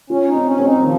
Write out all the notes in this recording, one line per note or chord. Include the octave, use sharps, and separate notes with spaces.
C#4 F4
D#4
C4
C#4
C4
D#4
F#3
D#3 F3